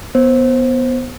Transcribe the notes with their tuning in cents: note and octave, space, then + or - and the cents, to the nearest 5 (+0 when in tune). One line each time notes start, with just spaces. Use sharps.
B3 +0 C5 +15